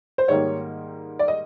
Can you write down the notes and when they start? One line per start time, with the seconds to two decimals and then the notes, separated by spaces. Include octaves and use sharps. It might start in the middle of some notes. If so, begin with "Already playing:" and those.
0.18 C5
0.28 G#2 D#3 G3 A#3 C#5
1.19 D5
1.28 D#5